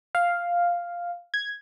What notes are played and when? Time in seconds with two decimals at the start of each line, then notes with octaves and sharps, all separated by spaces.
0.15 F5
1.34 G#6